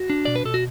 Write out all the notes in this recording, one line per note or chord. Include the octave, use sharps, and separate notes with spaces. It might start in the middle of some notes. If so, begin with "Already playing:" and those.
Already playing: F#4
D4
B2 D5
B4
B2 A4
F#4